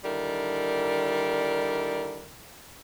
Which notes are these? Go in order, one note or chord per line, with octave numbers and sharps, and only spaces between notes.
D3 D#3 G3 E4 A#4